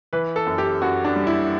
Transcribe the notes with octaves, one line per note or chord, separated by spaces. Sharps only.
E3 B4
A4
F#2
G4
F#2 F#4
D4
G3
E4